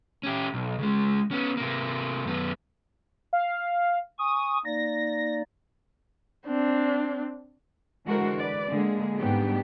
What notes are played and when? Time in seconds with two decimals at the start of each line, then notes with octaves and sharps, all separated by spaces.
0.23 C#4 G4
0.54 B1
0.79 C#2 G#3
1.31 B3 C#4
1.57 C3 A#3
2.25 F#2 B3
3.33 F5
4.19 G#5 C#6 D#6
4.65 A#3 D#4 D5 A#6
6.46 C4 D4
8.06 D3 E3 G#3 F#4 A#4 C5
8.38 B4 D5
8.69 D3 G#3 A#3 G#4
9.17 G#2 G3 A3 B3 D4 G4